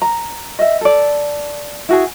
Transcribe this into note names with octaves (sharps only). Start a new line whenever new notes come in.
A#5
D#5 E5
A4 D5
E4 F#4 G#4